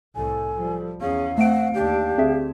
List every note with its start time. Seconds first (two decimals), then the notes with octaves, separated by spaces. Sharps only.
0.15 C2 A2 A4 G#5
0.56 F3 G3
1.01 E2 C#4 G#4 F5
1.38 A3 C4 F#5 D7
1.74 D#2 D4 G4
2.18 D2 C4 G#4 E5